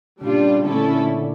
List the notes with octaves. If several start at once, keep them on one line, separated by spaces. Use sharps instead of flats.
A#2 C#3 G3 D4 F4
A#2 D3 A3 C#4 E4 A4